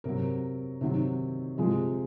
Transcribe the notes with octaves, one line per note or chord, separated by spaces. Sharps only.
C3 F#3 A#4
C3 D#3 F#3
C3 F3 G#3